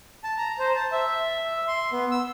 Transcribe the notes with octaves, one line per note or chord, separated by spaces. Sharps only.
A5
A#5
C5
A5
E5
C6
B3
E6